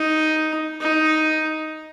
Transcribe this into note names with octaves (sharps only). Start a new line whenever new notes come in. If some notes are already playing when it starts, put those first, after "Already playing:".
Already playing: D#4
D#4